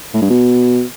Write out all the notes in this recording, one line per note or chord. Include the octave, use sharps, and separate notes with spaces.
A2
G2
B2